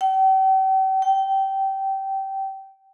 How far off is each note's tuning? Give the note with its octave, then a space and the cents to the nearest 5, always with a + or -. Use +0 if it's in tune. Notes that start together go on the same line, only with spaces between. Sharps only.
G5 -40
G5 -20